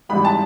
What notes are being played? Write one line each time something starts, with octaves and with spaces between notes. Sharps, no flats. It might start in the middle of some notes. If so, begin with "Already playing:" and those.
G#1 G#2 E3 G3 B5
A5